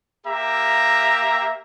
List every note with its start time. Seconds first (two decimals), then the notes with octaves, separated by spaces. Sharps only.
0.26 A#3 G4 E5 A#5